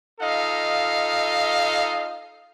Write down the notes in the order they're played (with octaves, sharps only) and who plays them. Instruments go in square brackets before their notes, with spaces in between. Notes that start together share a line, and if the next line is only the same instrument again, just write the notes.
[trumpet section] D#4 F4 A4 D#5 F5